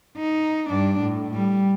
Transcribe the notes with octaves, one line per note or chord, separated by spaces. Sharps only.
D#4
G2 D4
A2
G3